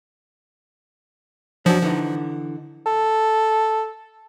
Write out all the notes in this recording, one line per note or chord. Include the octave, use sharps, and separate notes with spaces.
F#2 F3 F#3 D4
D3 E3 D#4
A4